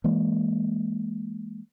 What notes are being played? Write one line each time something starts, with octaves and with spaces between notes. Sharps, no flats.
E3 G#3 A#3